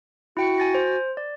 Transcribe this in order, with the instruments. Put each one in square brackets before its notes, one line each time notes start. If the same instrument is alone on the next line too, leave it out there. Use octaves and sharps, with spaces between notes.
[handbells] E4 G5 C#7 [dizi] F#4
[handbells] G#5 A6 A#6
C5
D5